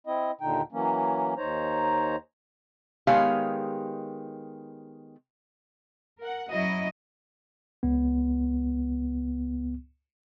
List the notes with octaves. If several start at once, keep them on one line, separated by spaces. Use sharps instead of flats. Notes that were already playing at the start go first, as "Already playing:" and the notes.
C4 E4 D#5
D#2 A#2 D3 D#4 G5
E3 F#3 A#3 C#4
D#2 D#4 C5 C#5 A#5
D#3 G#3 B3 G4 C#5 F5
A#4 F#5
F#2 F#3 E4 D#5
C#2 B3